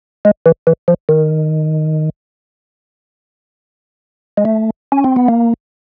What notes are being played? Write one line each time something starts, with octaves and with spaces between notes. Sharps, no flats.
G#3
E3
E3
F3
D#3
G#3
A3
C#4
C4
B3
A#3